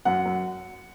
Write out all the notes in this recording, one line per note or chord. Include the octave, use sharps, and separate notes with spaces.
F#2 F#5
F#2